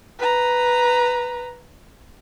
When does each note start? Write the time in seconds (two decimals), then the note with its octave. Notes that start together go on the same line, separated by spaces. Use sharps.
0.19 B4 A#5